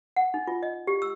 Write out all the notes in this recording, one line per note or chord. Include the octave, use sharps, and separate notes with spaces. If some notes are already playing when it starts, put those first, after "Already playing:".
F#5
D#4
F4
D#5
G4
E6